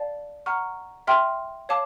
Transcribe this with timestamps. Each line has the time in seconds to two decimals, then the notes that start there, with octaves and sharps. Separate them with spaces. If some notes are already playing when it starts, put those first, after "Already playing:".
Already playing: D5 F5 A5
0.46 F#5 A#5 C#6 F6
1.07 E5 G5 C6 F6
1.69 C#5 F5 A5 D6